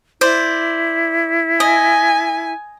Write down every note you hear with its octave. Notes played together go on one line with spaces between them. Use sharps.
E4 C5 D5
D#5 G#5